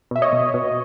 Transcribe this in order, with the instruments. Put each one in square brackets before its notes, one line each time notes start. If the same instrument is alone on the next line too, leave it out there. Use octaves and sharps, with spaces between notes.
[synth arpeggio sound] B2 E5
C#5 D#5
B2
B2